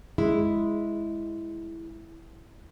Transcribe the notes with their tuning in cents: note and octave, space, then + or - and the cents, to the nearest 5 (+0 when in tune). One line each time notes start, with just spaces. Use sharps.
G#3 +0 E4 +0